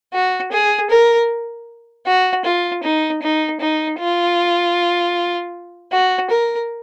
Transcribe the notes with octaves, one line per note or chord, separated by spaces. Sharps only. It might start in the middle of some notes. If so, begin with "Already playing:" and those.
F#4
G#4
A#4
F#4
F4
D#4
D#4
D#4
F4
F#4
A#4